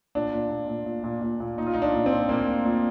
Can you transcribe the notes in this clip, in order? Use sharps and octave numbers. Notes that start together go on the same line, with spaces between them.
A#2 D4
A#2
A#2
A#2
A#2
A#2
A#2
A#2
A#2 D#4
F4
D#4
A#2
D4
A#2
C4
A#2
A#2 A#3
A#2
A#2